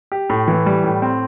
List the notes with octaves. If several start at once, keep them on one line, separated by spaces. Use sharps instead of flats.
G4
A2
E3
G3
A2
C4